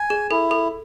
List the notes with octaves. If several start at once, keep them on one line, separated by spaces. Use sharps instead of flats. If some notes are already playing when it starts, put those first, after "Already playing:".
Already playing: G#5
G#4
E4 A4
A4